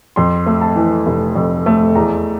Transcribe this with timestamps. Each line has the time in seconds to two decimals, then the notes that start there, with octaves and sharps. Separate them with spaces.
0.16 F2 C6
0.46 A3
0.61 A5
0.76 E3
1.07 F1
1.36 F2
1.66 A3
1.95 E2 A#5